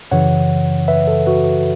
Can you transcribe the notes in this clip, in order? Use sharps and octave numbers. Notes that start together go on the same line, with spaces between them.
F#2 C#3 E3 C#5 F#5
B4 E5
A4
F#4 B4